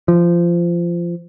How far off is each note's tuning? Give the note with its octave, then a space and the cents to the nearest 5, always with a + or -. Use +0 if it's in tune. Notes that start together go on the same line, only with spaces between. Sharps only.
F3 -20